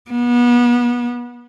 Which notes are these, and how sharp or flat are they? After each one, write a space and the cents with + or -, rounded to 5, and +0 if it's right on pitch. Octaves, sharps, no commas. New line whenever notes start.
B3 -30